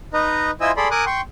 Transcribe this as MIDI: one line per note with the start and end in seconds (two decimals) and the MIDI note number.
0.14 0.51 63
0.14 0.51 71
0.14 0.51 75
0.14 0.51 82
0.61 0.71 64
0.61 0.71 65
0.61 0.71 72
0.61 0.71 75
0.61 0.71 80
0.61 0.71 88
0.77 0.88 68
0.77 0.88 69
0.77 0.88 74
0.77 0.88 83
0.77 0.88 84
0.91 1.05 70
0.91 1.05 80
0.91 1.05 86
0.91 1.05 87
0.91 1.05 90
1.06 1.21 79
1.06 1.21 84
1.06 1.21 85